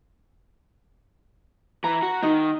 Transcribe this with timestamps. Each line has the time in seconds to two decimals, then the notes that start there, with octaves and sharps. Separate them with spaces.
1.84 E3 A#5
2.02 F#4
2.23 D#3 D#4